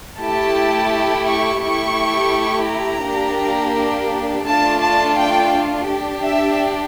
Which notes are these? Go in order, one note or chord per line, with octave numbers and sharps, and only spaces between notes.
A3 E4 G4 A5
C#6
A3 E4 G4 C#6
A#5
A#3 D4 G4
A3 D4 F4 A5
A5
G5
D4 G4
E5